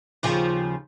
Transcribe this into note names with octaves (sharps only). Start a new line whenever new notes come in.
D#2 C#3 F3